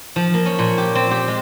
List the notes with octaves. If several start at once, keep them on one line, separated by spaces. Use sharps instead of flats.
F3
A#3
C#4
A#2
G4
C4
G4
G#3